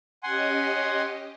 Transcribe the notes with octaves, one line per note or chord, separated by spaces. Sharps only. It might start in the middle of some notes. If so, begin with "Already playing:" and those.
C#4 G4 D#5 F#5 G#5 C6